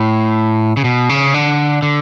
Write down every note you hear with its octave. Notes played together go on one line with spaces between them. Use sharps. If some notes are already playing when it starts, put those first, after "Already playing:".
Already playing: A2
C#3
B2
C#3
D3
D3